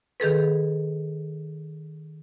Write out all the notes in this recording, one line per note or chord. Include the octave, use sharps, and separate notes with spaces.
D#3 G#4 A4 B4